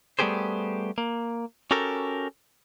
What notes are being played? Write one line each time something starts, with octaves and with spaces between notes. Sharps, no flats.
G3 A3 B3 G4 G#4 C5
A#3
C#4 F#4 G4 A4 A#4